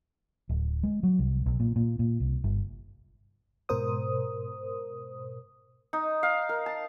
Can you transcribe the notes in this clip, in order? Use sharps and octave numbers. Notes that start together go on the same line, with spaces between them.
D1
G#3
F#3
C2
B1
A#2
A#2
A#2
C2
G1
G#2 B2 A#4 C5 D#6
D#4
F5
A#4
A5